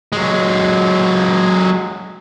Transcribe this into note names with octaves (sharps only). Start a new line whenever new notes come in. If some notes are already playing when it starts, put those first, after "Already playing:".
F#3 G#3